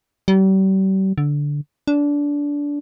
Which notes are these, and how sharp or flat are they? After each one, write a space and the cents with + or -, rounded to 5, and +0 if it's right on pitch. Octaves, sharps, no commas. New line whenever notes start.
G3 -40
D3 -10
D4 -20